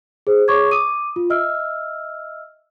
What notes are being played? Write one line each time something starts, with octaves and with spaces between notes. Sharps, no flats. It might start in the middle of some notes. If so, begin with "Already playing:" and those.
G#4 C5
G#4 C#5 C#6 D6 G#6
D6 D#6 D#7
F4
D#5 E5 E6 F6